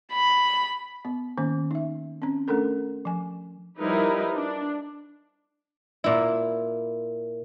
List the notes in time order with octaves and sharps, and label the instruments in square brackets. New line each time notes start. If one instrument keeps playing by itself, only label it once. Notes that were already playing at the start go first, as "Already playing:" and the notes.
[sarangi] B5
[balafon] B3
D#3 A#3 C#4
D#4 E5
C4 C#4
A3 C#4 D4 A4 A#4
F3 G#5
[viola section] F3 G3 D#4 E4 A#4 B4
D4
[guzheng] A#2 E4